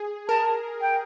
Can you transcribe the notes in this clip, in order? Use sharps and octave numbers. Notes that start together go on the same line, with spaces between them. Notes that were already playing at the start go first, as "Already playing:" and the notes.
Already playing: G#4
A#4 A5
G5